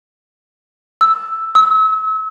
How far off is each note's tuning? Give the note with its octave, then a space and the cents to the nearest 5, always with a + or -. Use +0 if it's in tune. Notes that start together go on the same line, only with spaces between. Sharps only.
E6 +0
E6 -35